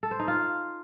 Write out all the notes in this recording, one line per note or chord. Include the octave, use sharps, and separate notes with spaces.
A4
C5
D#4
F4